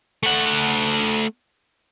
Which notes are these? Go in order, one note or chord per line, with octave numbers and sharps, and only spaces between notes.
A3 F#5